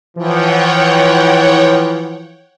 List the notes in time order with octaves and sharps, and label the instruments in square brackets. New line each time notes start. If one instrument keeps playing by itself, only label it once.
[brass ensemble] E3 F3 [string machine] C#5 F#5 G5